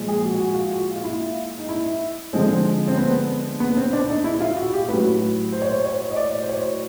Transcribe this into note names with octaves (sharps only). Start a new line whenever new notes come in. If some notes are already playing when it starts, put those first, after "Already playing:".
Already playing: A#2 F3 G#3
G#4
F#4
F#4
F4
F#4
F4
E4
D#4
E4
D3 F3 G#3 C4
C4
B3
B3
C4
D4
D#4
E4
F4
F#4
G4
A2 F#3 B4
C5
C#5
C5
C#5
D#5
D5
C5
C#5